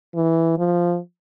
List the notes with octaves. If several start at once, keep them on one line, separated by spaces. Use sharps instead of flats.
E3
F3